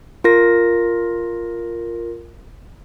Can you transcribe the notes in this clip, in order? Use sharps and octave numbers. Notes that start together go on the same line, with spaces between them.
F4 A#4 A#6